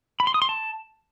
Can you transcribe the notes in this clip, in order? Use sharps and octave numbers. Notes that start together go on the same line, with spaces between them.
B5
C6
D#6
C6
A5